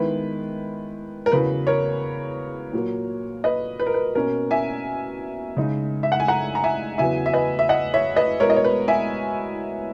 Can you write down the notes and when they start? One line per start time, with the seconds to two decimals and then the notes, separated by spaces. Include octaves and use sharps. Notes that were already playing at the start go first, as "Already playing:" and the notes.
Already playing: D#3 G#3 B3 E4 B4
1.26 A#4
1.31 E2 C#3 F#3 B3 B4
1.67 A#4 C#5
2.73 A#2 F#3 A#3
3.44 B4 D#5
3.80 B4
3.86 A#4
3.94 B4
4.15 B2 A#3 C#4 A#4
4.51 E5 G#5
5.57 C#3 G#3 D#4
6.03 E5
6.12 F#5
6.20 G#5
6.28 F#5 A#5
6.55 A#5
6.64 E5 G#5
6.98 E2 C#3 F#3 B3 E5 G#5
7.26 E5
7.33 B4 D#5
7.59 E5
7.69 D#5 F#5
7.94 C#5 E5
8.16 B4 D#5
8.40 B2 G#3 B3 E4 A#4 C#5
8.50 D#5
8.56 C#5
8.64 B4
8.88 E5 G#5